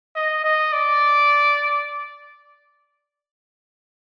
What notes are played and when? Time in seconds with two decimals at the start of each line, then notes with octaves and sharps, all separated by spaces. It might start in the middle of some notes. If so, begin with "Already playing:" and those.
0.16 D#5
0.44 D#5
0.73 D5